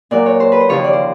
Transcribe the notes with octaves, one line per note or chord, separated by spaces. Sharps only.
A#2 F#3 D5
C#5
C5
B4
C5
D#2 C#3 F3 C#5
D5
C5